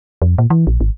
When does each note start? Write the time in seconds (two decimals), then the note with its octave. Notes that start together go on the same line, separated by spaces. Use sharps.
0.22 F2
0.38 A#2
0.50 E3
0.67 A#1
0.81 G#1